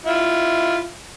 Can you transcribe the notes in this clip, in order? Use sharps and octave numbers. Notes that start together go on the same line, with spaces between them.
E4 F4